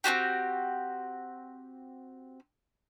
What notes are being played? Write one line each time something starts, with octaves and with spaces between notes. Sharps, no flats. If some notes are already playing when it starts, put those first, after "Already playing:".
C4 D4 F#4 G4